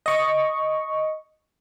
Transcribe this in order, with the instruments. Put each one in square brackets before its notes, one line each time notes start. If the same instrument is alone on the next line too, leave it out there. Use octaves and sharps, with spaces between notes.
[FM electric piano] D#5 C#6